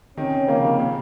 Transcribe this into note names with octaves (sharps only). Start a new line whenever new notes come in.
C3 D#3 C#4
C#3 F3 A#3
C3 D#3
A#2 C#3